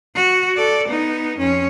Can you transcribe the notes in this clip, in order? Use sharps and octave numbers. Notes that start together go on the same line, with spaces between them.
F#4
A4 D5
B3 D#4
F2 C#4